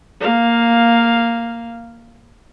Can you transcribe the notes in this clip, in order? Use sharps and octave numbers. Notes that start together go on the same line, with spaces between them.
A#3 F5